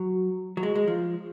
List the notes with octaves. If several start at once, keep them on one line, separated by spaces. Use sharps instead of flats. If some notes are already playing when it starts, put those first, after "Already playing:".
Already playing: F#3
F#3
G#3
G#3
F3